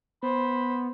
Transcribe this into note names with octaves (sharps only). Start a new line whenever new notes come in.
B3 C5 B5